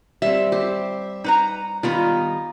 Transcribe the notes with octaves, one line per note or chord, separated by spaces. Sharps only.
G3 C4 E5
G4 C5
D#4 B4 A#5
D#3 G3 B3 F4 A#5